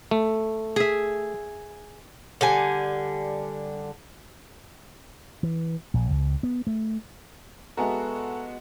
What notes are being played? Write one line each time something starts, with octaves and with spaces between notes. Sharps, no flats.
A3
G#4 E5
D3 G3 G#5
E3
A#1
C#2
B3
A3
G#3 B3 F#4 A4 E5 G#5 A#5